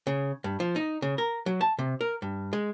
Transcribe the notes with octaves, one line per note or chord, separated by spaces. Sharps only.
C#3
G2
F3
D#4
C#3
A#4
F#3
A5
C3
A#4
G2
G#3